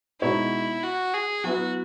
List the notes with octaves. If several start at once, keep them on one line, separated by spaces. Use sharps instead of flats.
B2 G#3 D#4 E4 F#4 C#5
F#4
G#4
F#3 B3 E4 F#4 B4